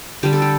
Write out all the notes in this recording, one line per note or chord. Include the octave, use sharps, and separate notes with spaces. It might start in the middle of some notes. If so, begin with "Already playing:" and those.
D3 G3 G4
A4
G4